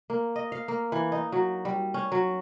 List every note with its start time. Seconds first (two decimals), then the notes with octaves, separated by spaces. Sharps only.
0.10 A#3
0.36 D#5
0.52 F5
0.68 A#3
0.92 E3
1.12 D#4
1.32 F#3
1.65 G3
1.94 C#4
2.12 F#3